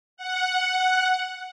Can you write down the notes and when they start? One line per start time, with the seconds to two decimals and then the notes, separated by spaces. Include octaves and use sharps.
0.17 F#5